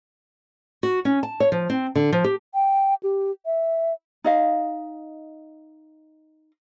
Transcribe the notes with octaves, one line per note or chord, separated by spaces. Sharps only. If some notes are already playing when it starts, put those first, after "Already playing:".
F#4
C#4
A5
C#5
F3
C4
D3
F3
G4
G5
G4
E5
D#4 D#5 F5